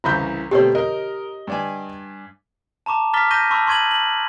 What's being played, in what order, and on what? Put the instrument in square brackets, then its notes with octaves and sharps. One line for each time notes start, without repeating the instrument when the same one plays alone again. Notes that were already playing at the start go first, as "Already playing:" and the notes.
[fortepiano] C2 C#3 E3 [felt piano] A#5 B5 G6
[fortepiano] B2 A3 C4 [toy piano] G4 C#5
[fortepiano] A#4 [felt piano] D#5
[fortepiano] G2 D5 G#5
[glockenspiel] A5 A#5 C#6 D6
A#5 D6 F6 A6 B6 G7
C#6 G6 A#6 D#7 G7
A5 B5 C#6 D6 E6
C6 C#6 G#6 D#7 F#7
F#7